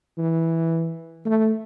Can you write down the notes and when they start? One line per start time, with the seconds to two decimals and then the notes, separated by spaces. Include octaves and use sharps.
0.18 E3
1.26 A3